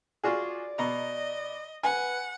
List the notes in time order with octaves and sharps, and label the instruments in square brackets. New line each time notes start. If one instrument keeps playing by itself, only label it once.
[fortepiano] F4 F#4 G#4 [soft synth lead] D5
[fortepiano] B2 A#5 [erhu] D#5
[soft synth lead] B4 [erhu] F#5 [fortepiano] G#5